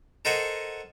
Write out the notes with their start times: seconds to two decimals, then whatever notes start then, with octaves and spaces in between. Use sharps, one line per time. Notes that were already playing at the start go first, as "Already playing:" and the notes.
0.25 A4 A#4 C5 D#5 F#5 G#5